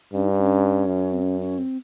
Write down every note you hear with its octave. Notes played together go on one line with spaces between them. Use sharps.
G2 C#4
D#4
D4
C#4
F#2
C4
C#4
C#4
C4